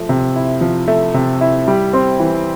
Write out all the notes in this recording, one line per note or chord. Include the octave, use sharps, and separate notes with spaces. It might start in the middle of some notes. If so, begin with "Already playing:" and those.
Already playing: F3 A3
C3
E4
F3
A3
C3
E4
G3
C4
E3